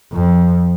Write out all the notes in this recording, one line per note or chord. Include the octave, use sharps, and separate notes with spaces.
F2